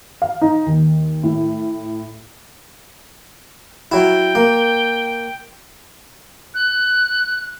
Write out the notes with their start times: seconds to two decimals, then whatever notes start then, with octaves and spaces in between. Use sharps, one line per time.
0.22 F5
0.42 D#4
0.66 D#2
1.23 A2
3.92 F#3 E4 G5
4.35 A#3
6.54 F#6